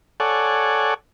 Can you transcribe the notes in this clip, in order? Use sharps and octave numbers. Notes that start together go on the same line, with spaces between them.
A4 C#5 D5 F#5 G#5